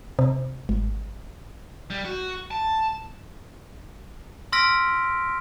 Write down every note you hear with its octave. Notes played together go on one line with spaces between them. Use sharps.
C3
G#1
G3
F#4
A5
C6 E6 F6 A#6 B6 D7